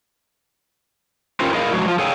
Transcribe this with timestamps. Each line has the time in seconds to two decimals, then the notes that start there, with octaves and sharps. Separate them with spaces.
1.40 C#4 E4 F4 G4 A#4 C5
1.53 E4 G#4 A#4 D#5 F5
1.73 F3 F#3 G#3 F#4
1.86 F3 F4
1.99 G#4 A4 C#5 F5 G5 G#5